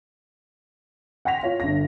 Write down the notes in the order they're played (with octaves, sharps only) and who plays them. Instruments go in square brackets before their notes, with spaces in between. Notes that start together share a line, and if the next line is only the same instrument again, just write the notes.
[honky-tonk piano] F#5 G5 C6 A#6 B6 F7
F4 C#5 F5
G1 A#6